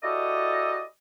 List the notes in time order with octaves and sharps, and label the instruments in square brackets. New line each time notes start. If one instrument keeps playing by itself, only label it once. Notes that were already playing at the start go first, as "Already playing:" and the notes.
[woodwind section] E4 F#4 G4 A4 D5 D#5